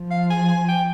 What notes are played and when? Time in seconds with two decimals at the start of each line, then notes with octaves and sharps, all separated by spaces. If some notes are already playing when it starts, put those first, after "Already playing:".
Already playing: F3
0.11 F5
0.30 G#5
0.49 G#5
0.68 G5